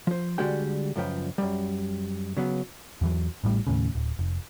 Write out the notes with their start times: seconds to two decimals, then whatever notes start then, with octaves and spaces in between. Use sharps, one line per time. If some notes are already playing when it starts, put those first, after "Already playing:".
0.07 F3 C5
0.38 D3 G3 G#3 F#4 G5
0.96 C#2 F#2 F3 B4 G5
1.38 F#2 G3
2.37 C#3 F#3 B3
3.01 E2 E3 F#3
3.44 A1 A2 G3
3.67 D#2 A2 C#3
3.95 D1
4.19 F1